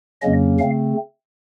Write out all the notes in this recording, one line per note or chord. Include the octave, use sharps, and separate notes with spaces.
F2 C#3 F#3 A#3 C#4 D#5
C#3 A3 C4 F5